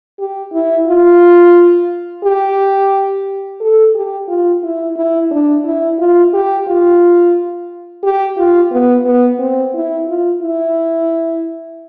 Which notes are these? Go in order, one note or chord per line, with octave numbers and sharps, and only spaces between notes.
G4
E4
F4
G4
A4
G4
F4
E4
E4
D4
E4
F4
G4
F4
G4
F4
B3
B3
C4
E4
F4
E4